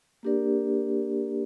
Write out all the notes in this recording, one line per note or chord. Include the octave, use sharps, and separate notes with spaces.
A#3 D4 G4 A#4 D5